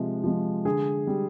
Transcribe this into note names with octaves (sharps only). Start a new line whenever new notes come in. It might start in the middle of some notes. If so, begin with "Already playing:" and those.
Already playing: C3 F3 G#3
F3 G#3
D3 G#4
G3